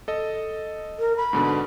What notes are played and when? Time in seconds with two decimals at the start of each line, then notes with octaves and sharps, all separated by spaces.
0.08 A4 D#5
0.99 A#4
1.17 B5
1.33 G#2 B2 D3